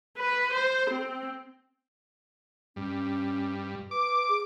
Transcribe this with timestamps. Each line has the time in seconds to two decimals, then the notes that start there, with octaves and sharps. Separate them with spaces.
0.18 B4
0.52 C5
0.90 C4
2.76 G2 C#4
3.91 B4 D6
4.29 G#4